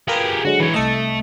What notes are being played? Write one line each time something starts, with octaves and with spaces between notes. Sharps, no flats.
F4 G4 G#4 A#4 B4
D3 F#3 G#3 F#4
E3 C#5
C2 A3 A4 D#5